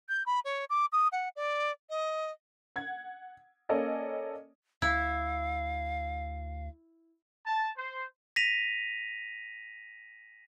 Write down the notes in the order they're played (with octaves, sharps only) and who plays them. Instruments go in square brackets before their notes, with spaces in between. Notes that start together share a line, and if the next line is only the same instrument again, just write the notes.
[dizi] G6
B5
C#5
D6
D#6
F#5
D5
D#5
[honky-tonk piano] F#5 G#6
A#3 C#4 A4 D5 D#5 G#5
[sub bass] D2 [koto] E4 [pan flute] F5
[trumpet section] A5
C5
[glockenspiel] A#6 B6 D#7 F7